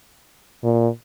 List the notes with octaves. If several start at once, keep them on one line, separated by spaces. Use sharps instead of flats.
A#2